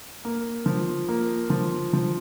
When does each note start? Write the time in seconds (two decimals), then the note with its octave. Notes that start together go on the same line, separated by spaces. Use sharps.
0.25 A#3
0.66 F3
1.08 A#3
1.50 F3
1.93 F3